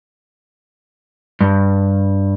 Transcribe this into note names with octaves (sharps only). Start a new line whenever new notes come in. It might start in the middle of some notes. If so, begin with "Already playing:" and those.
G2